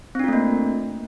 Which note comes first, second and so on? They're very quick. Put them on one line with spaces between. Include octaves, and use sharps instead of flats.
C4 D4 F4 A3 A#3